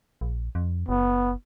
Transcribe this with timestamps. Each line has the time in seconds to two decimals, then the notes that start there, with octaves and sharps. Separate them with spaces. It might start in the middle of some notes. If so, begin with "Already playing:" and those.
0.21 A#1
0.55 F2
0.88 F#1 B3